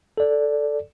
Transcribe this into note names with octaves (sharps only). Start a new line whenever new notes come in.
A4 D5